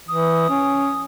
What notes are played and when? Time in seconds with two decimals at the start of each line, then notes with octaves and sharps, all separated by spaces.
0.08 E3 D#6
0.49 C#4